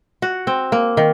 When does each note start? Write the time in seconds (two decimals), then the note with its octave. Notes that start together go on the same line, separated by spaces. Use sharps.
0.22 F#4
0.47 C4
0.72 A#3
0.97 D#3